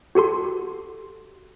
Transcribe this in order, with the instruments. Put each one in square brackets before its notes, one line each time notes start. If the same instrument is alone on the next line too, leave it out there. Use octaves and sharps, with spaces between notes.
[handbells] F#4 G4 A4 C6